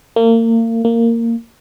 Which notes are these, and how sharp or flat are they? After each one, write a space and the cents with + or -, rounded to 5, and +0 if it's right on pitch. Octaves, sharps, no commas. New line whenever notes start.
A#3 -35
A#3 -15